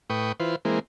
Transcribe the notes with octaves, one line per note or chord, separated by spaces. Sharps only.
A2 B4 G5 C#6 D#6
E3 F4 B4 C5
E3 G#3 A#3 C4